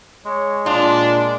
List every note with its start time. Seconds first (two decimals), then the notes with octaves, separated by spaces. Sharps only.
0.24 G#3 C#5
0.66 A#2 D4 F4